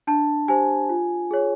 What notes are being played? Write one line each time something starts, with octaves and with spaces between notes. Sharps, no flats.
D4 A5
G4 C5 G#5
F4
G#4 C#5